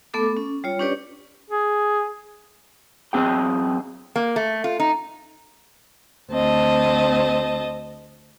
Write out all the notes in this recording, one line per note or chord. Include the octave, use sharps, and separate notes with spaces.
A3 B3 A4 D6
C#4
G3 F4 C#5
C#4 D4 G4 B4 C#5 D5
G#4
F#2 C4 G#4 G5
A#3
A3
F4
D#4
D2 C4 D#5 A5